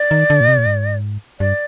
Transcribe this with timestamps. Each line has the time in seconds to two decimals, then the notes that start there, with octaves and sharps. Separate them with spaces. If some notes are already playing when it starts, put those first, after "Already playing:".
Already playing: D5
0.11 D#3
0.30 D3
0.41 A#2
0.48 C3
0.58 A#2
0.66 G#2
1.40 G2 D5